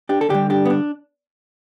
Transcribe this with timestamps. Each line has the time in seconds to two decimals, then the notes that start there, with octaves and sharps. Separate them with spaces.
0.09 D4 G4
0.21 A4
0.29 D3 G3 D4 G4
0.50 D4 G4
0.65 B3
0.70 D4